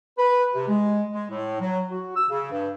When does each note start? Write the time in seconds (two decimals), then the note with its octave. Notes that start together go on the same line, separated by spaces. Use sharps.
0.18 B4
0.54 C3
0.68 G#3
1.12 G#3
1.30 A2
1.60 F#3
1.90 F#4
2.15 E6
2.29 C#3
2.51 G2